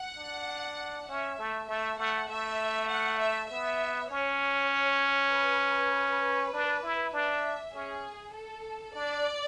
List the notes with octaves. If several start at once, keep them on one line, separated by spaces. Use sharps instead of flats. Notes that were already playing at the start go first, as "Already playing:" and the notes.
Already playing: F#5
D4
C#4 E5
A3
A3 E5
A3 F#5
A3 E5
F#5
E5
B3 E5
C#4 C#5
B4
B4
D4
E4
D4 E5
C#4 G#4
A4
D4 D5